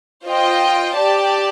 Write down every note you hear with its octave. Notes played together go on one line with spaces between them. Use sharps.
F4 C5 D#5 G5
G4 D5 A5